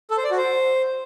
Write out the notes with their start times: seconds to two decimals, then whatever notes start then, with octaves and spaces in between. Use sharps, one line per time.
0.10 A4
0.17 C5
0.24 D5
0.31 F#4
0.38 C5